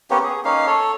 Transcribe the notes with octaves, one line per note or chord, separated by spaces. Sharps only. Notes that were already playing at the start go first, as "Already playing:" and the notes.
A#3 B3 C#4 G4
G#4
A#3 C#4 D#4 F5
A4 C#5